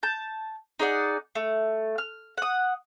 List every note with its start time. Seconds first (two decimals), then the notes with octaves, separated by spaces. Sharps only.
0.03 A5 G6
0.79 D#4 G#4 D5 F#5
1.35 A3
1.98 F6
2.38 F#5 D#6